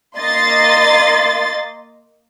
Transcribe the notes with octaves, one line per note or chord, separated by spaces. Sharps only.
A#3 D#5 C6 A6